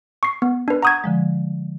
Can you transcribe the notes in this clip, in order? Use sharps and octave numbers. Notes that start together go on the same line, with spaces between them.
C#6 C7
B3
D4 B4
F#5 A#5 C#6 D#6 G6 G#6
D3 F3 G#3